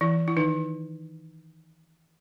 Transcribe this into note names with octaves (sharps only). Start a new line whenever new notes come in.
E3 E4
E4
D#3 D#4